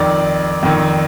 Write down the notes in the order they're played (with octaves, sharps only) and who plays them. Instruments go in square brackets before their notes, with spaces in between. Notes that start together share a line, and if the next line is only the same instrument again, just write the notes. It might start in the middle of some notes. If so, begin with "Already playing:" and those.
Already playing: [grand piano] F2 D#3 D5
F2 D#3